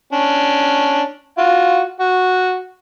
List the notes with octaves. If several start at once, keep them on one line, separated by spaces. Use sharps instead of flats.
C#4 D4
F4 F#4
F#4